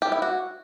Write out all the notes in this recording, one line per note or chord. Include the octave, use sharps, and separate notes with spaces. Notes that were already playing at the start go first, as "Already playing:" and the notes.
G4
E4
F#4